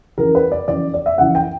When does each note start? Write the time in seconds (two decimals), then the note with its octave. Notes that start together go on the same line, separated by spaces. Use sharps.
0.18 F#2 E3 A#4
0.35 B4
0.52 D5
0.68 F#2 E3 D5
0.94 D5
1.06 E5
1.18 F#2 E3 F#5
1.35 G5